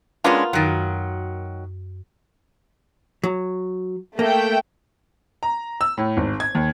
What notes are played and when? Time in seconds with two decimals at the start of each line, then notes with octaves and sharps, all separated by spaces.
0.24 G#3 A#3 B3 C#4 D4 F4
0.53 F#2 D#3 F#3 A6
3.24 F#3
4.19 A3 A#3 G5
5.43 A#5
5.81 E6
5.97 A2
6.17 G#1
6.40 G#6
6.55 D#2